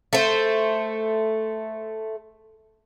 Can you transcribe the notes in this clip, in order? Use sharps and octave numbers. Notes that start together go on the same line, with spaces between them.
A3 C5